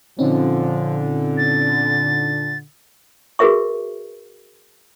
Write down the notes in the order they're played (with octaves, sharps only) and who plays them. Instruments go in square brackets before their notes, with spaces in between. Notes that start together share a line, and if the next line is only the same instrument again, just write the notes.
[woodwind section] A#2 D3 [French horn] F3 [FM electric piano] C4 C#4 D#4
[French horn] D4 [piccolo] A6
[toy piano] F#4 G#4 A#4 B4 E5 C#6